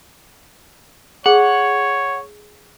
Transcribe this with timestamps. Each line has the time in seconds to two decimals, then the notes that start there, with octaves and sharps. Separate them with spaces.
1.26 G#4 C#5 F#5